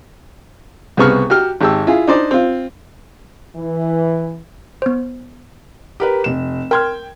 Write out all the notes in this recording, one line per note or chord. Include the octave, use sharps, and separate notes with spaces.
C2 C#3 B3 C#6 F6
F#4 G4 F6
G#1 G4 E6
E4 F4 G#4
D4 D#4 C5 D5
C4 F4
E3
B3 C5
G4 A#4 B4
F1 E7
A#4 G5 C6 F6 G#6